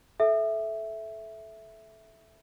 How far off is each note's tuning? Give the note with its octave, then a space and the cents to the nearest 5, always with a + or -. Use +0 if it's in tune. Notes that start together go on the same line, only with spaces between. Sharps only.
A4 -25 E5 +0